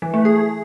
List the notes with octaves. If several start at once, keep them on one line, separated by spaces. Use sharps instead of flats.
E3
A3
G#4